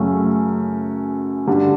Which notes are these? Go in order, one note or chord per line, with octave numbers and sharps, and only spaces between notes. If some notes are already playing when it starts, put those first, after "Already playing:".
Already playing: F#2 C#3 F#3 A3 C#4
G2 D3 G3